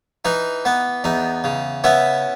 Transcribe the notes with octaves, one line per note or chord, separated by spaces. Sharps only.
E3 D#4
B3
E2 D#4
C#3
B3 C#4 E4